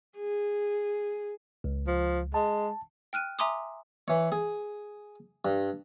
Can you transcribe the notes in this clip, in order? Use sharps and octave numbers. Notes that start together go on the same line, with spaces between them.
G#4
C#2
F3
G#3 A5
G5 F6 F#6 D#7
E5 G#5 A#5 C6 D6 D#6
E3 C#5
G#4
G2